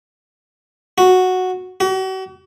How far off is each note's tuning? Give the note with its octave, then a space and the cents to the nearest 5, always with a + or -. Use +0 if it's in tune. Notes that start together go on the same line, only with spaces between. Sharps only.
F#4 -5
F#4 +40